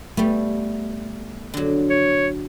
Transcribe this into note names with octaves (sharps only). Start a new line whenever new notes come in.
G3 A3 B3
D3 F#3
C#5